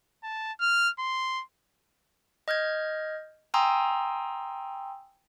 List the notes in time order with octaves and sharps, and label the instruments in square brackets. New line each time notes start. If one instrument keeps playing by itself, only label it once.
[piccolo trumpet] A5
F6
C6
[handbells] D#5 F6 G6 G#6
G5 G#5 A#5 C6 D#6 E6